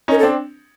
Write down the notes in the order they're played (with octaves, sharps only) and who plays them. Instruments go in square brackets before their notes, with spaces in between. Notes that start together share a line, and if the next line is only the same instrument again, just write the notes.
[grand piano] C#4 D#4 [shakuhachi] A#4
[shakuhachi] A4
[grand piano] C4 D4